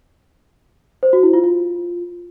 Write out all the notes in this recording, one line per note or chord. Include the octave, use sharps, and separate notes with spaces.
C5
F#4
E4
F4
F4